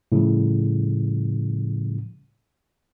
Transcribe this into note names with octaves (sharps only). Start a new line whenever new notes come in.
A2 C#3 F3 G3